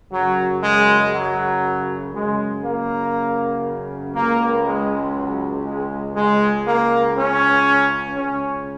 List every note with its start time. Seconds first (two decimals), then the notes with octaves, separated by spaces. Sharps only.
0.12 F#2 C#3 F#3
0.63 G#3
1.13 F#3
2.13 F#2 C#3 G#3
2.64 A#3
4.14 C#2 C#3 A#3
4.65 G#3
5.15 F#3
5.65 G#3
6.15 C#2 C#3 G#3
6.67 A#3
7.17 C#4
8.17 C#2 C#3 C#4